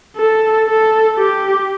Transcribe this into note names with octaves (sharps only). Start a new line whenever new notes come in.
A4
A4
G4